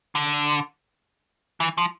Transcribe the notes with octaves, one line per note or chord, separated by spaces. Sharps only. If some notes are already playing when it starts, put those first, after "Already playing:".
D3
E3
F3